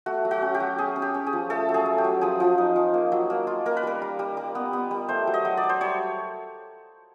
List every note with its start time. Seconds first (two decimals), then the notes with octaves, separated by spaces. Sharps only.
0.06 A3 F#4
0.25 F#3
0.31 F#4
0.42 C#4
0.54 G4
0.60 F#3
0.78 C#4 G#4
0.96 C#4
1.02 G4
1.14 C#4
1.27 G#4
1.33 F3
1.50 A3 A4
1.69 F#3
1.74 G#4
1.85 A3
1.98 G4
2.04 F#3
2.21 F3 G#4
2.40 F3
2.58 D#4
2.76 F3
2.94 A#3
3.12 F#3
3.30 A#3
3.47 F4
3.66 A#3 A#4
3.77 B4
3.83 G3 A#4
4.02 G3
4.19 G3
4.37 G3
4.55 B3
4.73 B3
4.91 G3
5.09 A3 C5
5.27 F#3
5.34 D#5
5.45 F#3
5.57 D5
5.63 F#3
5.69 C5
5.81 G3 C#5